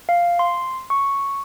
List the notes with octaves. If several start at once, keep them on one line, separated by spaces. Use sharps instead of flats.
F5
C6
C#6